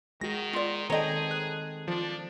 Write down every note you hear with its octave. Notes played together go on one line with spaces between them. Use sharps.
D#3 G#3 F#4 A#6
F4 D5
D#3 C4 G#4 A4 C#5 D#5 G5 A#5
F#6
F3 D4